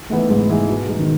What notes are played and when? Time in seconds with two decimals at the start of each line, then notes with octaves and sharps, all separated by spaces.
0.10 E3 A3 B3 D#4 G#4
0.30 G#2 G#3
0.49 E3 B3 D#4 G#4
0.69 B2
0.88 G#3 D#4
0.99 D#3